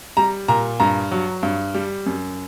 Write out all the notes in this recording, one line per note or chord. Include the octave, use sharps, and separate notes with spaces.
G3 A#5
A#2 A#5
G2 A#5
F#3
G2
G3
F#2